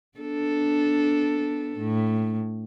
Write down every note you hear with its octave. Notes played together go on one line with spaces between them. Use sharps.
B3 D4 A4
A2